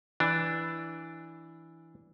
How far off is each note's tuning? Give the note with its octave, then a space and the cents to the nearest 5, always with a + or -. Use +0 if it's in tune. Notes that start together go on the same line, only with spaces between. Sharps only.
E3 +0 D4 +0